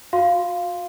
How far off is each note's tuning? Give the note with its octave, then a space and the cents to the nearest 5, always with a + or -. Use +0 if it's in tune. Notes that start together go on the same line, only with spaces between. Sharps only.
F#4 -45 F5 +0 C6 +0